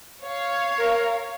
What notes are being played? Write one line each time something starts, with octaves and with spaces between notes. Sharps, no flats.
C#5 F5
A#4